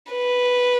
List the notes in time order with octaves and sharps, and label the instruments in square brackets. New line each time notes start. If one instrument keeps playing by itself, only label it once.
[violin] B4